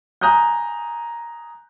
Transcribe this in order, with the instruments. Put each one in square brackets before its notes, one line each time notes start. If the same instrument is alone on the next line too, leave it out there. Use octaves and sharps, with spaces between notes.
[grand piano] G#5 A#5 D#6 F#6 G6